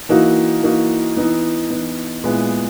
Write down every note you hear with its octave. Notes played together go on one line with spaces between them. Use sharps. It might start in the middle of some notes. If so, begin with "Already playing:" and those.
E3 A#3 D#4 F#4
E3 A#3 D#4 F#4
E3 B3 D#4
E3 B3 D#4
A#2 G#3 B3 E4 G#4